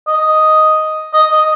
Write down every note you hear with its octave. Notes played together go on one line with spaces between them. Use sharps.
D#5
D#5
D#5